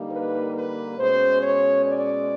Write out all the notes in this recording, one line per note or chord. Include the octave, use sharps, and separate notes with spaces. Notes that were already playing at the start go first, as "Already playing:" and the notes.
Already playing: D3 G3 A#3 D#4
B4
B4
B2 G#3 C#4 C5
C#5
D5